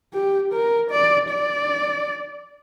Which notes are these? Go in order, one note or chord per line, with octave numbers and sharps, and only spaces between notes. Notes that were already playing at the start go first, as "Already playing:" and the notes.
G4
A#4
D5
D5